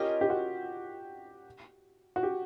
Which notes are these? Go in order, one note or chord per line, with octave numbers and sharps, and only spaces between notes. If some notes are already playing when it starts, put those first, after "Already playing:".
Already playing: C#4 F4 G4 A#4 D#5
G4
F#4
F#4
G4